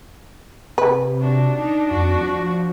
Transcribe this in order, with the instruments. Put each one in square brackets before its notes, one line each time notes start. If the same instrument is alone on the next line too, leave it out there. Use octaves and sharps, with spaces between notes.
[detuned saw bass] C3 [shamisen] B4
[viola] D4 [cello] F#4
[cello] D#4
[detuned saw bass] F2 [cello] F#4
[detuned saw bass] F3